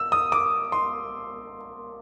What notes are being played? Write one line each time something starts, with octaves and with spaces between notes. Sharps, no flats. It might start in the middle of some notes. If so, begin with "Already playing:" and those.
Already playing: E6
D#6
D6
C6